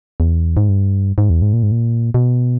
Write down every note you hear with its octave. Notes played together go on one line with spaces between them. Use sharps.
E2
G#2
G2
G#2
E2
G#2
A#2
G#2
A#2
B2